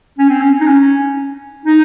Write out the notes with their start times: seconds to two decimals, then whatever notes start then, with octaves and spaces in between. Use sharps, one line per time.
0.18 C#4
0.30 C4
0.41 C#4
0.61 D#4
0.68 C#4
1.65 D#4